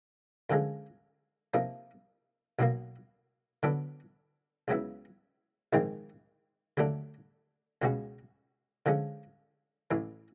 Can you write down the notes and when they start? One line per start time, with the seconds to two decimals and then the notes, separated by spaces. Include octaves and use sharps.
0.50 F#2 D3 F3 G#3
1.54 C3 F3 A#3 D#4
2.59 B1 B2 F#3 A#3
3.63 D3 F#3 B3 D4
4.68 C#2 C#3 F#3 B3 E4
5.73 A#1 G#2 D#3 G#3 C4
6.77 D#2 D3 F#3 A3 D4
7.82 C#2 B2 G#3 C#4 F#4
8.86 D3 F3 G#3 C#4
9.91 A1 A2 E3